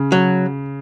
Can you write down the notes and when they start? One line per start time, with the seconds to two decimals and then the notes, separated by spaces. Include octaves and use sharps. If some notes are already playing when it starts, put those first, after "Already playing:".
Already playing: C#3
0.12 F#3